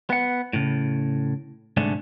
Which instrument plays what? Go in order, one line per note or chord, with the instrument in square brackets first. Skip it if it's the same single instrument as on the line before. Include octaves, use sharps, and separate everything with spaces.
[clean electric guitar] B3 F#5
A2 C#3
C2 G#2 D3 A3 G#4 D5